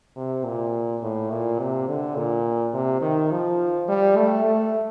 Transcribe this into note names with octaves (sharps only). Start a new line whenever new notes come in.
C3
A#2
A2
A#2
C3
D3
A#2
C3
D#3
F3
G3
A3
A3